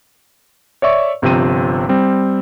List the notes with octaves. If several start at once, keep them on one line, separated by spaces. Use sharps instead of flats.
C#5 D5 E5 C#6
G1 C3 F3 C4 D#7
G3 C4